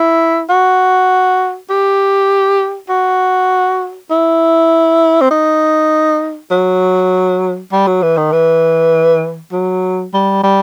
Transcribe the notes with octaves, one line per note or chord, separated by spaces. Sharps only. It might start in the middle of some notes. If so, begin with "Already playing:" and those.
Already playing: E4
F#4
G4
F#4
E4
C4
D#4
F#3
G3
F#3
E3
D#3
E3
F#3
G3
G3